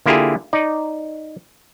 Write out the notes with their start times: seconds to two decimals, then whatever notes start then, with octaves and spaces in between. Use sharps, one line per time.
0.06 D3 A#3 E4 F4 G4 G#4
0.53 D#4 D5